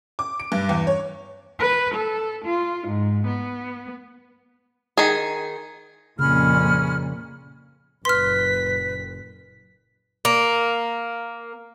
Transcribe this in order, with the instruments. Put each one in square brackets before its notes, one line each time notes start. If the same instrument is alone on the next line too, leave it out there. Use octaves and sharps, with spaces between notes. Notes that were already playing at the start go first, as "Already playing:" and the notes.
[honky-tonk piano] D6
D7
G2
E2
C#5
[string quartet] B4
A4
F4
G#2
B3
[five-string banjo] D#3 G#4
[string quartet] F2 A#2 [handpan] C#3 [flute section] C#4 B5 F6
[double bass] F#1 A#2 [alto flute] B4 [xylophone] C6 F6 [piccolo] B6
[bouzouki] A#3